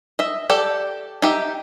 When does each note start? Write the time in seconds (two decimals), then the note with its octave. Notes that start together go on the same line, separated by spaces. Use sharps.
0.19 D#5 E5
0.50 G4 A4 D5
1.22 D#4 G4 E5